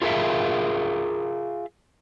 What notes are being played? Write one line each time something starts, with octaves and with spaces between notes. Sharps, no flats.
F4 G#4 A#4 B4 E5 F5